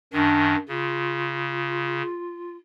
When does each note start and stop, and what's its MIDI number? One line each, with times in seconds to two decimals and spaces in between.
0.13 0.56 42
0.13 0.56 51
0.13 0.56 62
0.68 2.02 49
0.68 2.56 65